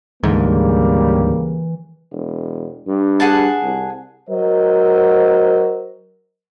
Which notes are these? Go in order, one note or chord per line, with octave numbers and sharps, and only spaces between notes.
D2 G#2 C#3 E3 G3 A#3
E1
G2
G#4 F#5 A5
C2
F#3 A#4 C5 D#5